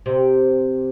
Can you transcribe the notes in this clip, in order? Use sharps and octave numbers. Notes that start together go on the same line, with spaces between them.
C3